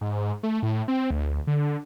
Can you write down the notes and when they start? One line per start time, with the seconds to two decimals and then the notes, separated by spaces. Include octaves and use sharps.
0.01 G#2
0.43 A3
0.63 A2
0.88 C4
1.11 D2
1.47 D3